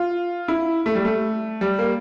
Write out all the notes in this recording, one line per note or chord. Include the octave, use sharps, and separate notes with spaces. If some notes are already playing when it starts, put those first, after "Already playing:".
Already playing: F4
E4
A3
G3
A3
G3
A#3